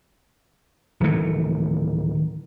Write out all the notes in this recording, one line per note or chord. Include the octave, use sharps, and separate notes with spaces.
D1 D#3 E3 A3